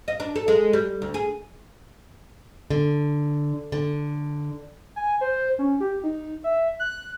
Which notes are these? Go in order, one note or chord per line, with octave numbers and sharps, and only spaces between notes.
D#5
D4
A4
G#3
G3
D2
G#4
D3
D3
G#5
C5
C#4
G4
D#4
E5
F#6